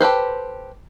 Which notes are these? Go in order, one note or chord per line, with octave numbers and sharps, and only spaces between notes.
G4 A4 B4 C5